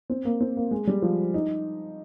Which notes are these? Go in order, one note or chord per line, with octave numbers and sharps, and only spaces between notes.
C4
A#3
C4
A#3
G#3
G3
F3
D#4